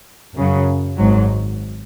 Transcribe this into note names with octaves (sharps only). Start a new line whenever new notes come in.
F#2 C#3 F#3
G#1 G#2 F#3